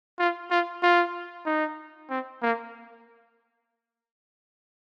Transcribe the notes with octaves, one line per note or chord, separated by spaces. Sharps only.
F4
F4
F4
D#4
C4
A#3